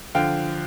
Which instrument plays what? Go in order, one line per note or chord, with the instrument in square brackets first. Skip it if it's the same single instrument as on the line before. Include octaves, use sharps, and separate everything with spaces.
[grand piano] D3 F3 F5 G5